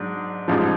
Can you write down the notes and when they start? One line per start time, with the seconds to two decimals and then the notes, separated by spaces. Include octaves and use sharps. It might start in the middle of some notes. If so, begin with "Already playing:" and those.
Already playing: G#2 F#3 D4
0.48 A1 G#2 F3